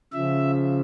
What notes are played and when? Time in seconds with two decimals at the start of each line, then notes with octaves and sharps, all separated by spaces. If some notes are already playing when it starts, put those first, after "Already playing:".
0.13 C#3 F3 E5